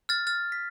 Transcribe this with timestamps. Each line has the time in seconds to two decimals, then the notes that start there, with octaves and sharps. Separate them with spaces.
0.09 F6 A6
0.27 F6 A6
0.52 B6